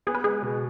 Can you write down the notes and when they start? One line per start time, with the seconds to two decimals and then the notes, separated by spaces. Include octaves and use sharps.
0.07 B3 G#4
0.15 B4
0.24 G#3 G#4
0.42 B2